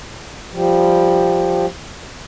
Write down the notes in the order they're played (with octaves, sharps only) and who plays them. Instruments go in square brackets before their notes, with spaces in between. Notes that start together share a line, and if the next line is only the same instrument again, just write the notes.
[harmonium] F3 G3